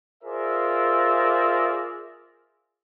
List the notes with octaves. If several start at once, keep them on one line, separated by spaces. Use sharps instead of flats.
F4 G#4 A#4 C5 D5 E5